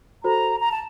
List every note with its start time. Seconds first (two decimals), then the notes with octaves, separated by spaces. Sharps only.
0.23 F#4 A4 C5 A#5
0.60 A#5
0.72 A5